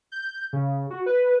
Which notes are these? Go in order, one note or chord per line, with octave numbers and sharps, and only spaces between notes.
G6
C#3
F#4
B4